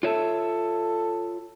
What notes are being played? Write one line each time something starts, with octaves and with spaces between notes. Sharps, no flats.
F4 A4 C#5 E5